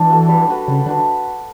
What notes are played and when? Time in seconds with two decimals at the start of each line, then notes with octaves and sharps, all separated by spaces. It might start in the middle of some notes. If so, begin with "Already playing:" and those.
Already playing: E3 D4
0.10 F#4 A4
0.29 G3
0.47 D4 F#4 B4
0.68 C#3 G3
0.86 D3 D4 F#4 B4